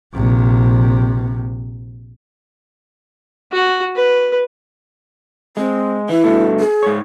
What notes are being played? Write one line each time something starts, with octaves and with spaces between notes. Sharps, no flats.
A#1 C3
F#4
B4
G#3 C4
E3 E4
G2 B2 A3
G#4
G#2 C#5